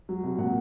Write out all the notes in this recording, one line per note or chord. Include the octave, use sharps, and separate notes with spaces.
F#3
C2
A#2 F#5